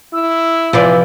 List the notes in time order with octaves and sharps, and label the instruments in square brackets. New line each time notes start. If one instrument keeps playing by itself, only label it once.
[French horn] E4 [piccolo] E6
[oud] C3 E3 D5 [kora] F3